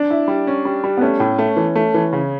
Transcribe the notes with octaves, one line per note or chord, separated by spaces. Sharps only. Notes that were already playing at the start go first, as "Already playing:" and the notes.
Already playing: D4
E4
G3
C#4
G3
G3
B3
A3 C#4
A2
A3
E3
A3
E3
C#3